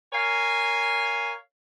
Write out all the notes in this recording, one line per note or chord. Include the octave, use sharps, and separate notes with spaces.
A#4 C#5 F5 G#5